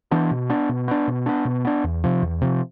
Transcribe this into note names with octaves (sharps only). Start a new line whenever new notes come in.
E3 B3 D4
B2
B3 D4
B2
B3 D4
B2
B3 D4
B2
B3 D4
E2
C3 F3
E2
C3 F3